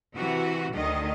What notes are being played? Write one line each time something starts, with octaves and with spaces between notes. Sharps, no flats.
C3 E3 F#4
D2 D#3 D#5